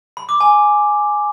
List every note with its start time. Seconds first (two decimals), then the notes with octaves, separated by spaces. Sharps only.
0.17 B5
0.29 D6
0.41 G#5